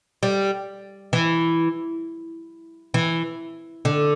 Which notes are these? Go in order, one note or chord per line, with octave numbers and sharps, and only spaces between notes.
G3
E3
E3
D3